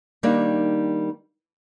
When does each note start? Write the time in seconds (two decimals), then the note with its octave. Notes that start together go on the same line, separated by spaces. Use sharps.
0.23 D#3 G3 A#3 D4 D#4